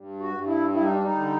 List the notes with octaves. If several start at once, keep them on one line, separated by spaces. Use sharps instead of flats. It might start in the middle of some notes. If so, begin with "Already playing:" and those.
Already playing: G2
F#4
G2
E4
G3 E4
D#4
D4
D#4
D3